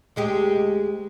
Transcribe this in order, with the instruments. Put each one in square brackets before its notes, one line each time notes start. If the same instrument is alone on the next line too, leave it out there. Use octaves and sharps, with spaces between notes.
[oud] D2 G#3 G4